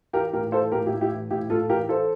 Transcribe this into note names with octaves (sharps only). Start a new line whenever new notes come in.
E3 G4 A#4
A2 G4 A#4
E3 A4 C5
A2 G4 A#4
E4 G4
A2
E4 G4
E3
A2 E4 G4
A2 F4 A4
E3 G4 A#4
E3 A4 C5